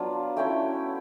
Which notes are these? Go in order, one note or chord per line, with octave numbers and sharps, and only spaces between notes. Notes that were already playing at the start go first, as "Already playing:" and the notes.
Already playing: F#3 B3 D4 F4
A3 C#4 E4 G5